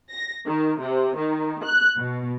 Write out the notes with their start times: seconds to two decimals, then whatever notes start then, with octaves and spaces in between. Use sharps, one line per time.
0.11 A#6
0.47 D#3
0.81 C3
1.17 D#3
1.64 F#6
1.97 B2